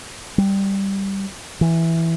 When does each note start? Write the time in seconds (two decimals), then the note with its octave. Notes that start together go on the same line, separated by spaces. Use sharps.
0.38 G3
1.61 E3